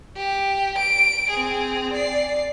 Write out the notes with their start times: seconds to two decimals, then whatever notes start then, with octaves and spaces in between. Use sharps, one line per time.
0.16 G4
0.78 D7
1.30 C4 G#4
1.92 D5 C7